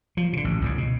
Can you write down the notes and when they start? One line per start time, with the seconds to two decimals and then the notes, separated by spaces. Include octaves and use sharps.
0.17 F3
0.33 B2 D3
0.44 A1
0.61 C#2 G#2 C#3
0.78 B2